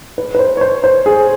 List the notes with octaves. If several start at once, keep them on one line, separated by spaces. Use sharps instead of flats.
B4
B4
C5
C#5
C5
C5
G#4